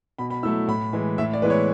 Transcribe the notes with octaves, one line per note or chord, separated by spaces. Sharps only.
B2 B5
B5
F#3 A3 E4 E6
A2 B5
E3 G#3
A2 E5
D5
E3 G#3 B3 E4 B4
C#5